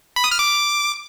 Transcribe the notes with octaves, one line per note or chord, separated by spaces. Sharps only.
B5
D#6
F6
D6